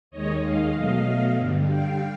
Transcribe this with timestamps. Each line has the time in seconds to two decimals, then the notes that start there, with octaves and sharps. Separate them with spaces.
0.11 D#2 D#3 G#3 C#5 D#5
0.42 D#5 F5
0.74 B2 F#3 A3
1.37 G2 D3 G3
1.68 F5 G5